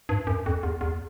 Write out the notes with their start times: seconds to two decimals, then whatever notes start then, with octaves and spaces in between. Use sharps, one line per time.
0.09 G2
0.27 F#2
0.46 F2
0.63 E2
0.81 E2